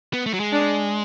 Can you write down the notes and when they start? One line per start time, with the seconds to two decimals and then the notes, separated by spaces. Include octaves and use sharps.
0.13 B3
0.26 A3
0.33 F#3
0.40 G#3
0.52 D4